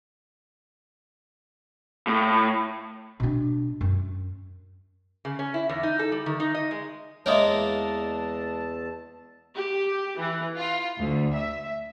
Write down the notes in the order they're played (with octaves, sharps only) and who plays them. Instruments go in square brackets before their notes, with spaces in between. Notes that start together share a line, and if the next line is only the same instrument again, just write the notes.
[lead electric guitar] A2
[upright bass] B2 D4
F#2
[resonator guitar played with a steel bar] C#3
C#4
E4
E2
D#4
A4
G3
D#3
D#4
D#5
G#3
[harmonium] E2 A5 [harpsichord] G#3 A#3 A#4 [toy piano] C#5 D#5 E5
[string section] G4
E3
F4
D2
E5